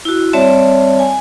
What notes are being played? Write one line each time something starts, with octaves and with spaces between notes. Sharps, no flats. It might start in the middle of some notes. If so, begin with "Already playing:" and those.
E4 F#4
G3 C4 C#5 D5 E5 A5
G#5